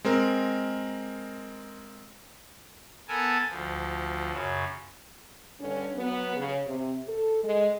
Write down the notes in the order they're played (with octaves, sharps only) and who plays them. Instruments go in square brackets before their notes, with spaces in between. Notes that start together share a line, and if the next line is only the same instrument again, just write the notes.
[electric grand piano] G#3 C4 A#4
[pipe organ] B3 A4 A#4 G#5 A5
D2 F3
F#2 C#3
[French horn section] G2 D3 C#4
F#3 B3
C#3
C3
A4
G#3